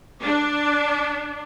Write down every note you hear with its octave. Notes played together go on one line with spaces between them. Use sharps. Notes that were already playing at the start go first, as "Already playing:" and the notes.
D4